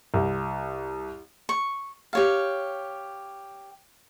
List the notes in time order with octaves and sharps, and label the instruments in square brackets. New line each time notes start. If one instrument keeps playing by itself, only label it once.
[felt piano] C2
[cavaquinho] C#6
G4 C#5 F5